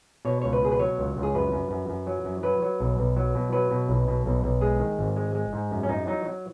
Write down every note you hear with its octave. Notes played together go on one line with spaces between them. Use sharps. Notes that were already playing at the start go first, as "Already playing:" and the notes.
B2 C#5
C#2 C#5
B4
B2 G#4
B4
F#3 C#5
C#2
C#2
G#4
F#2 B4
F#2
F#2
F#2
F#3
F#2
F#3 B4
F#3
B1
B1
F#3
B2
F#3 B4
B2
B1
B2
B1
B1
G#3 G#4
D#3
G#1
G#3
G#3
G#2
F#2
C#4
F#2 D#4
F#3 D#4
F#3